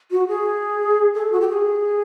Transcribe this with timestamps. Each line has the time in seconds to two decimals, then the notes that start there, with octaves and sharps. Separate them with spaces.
0.11 F#4
0.28 G#4
1.14 A4
1.32 F#4
1.41 G4
1.49 G#4